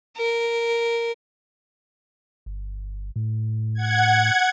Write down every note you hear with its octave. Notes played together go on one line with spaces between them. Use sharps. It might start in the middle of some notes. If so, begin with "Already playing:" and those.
A#4
G1
A2
F#5 G#6